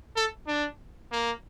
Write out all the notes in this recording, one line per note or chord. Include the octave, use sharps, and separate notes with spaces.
A4
D4
A#3